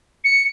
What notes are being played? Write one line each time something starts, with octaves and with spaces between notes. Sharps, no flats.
C#7